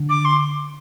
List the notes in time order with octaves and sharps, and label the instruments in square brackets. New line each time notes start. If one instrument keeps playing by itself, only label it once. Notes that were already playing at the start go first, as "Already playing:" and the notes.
Already playing: [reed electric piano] D3
[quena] D6
C6